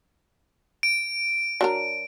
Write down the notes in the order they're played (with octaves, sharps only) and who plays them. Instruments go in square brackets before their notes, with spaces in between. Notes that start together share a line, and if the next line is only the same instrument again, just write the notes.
[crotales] D7
[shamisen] F#3 D4 A#4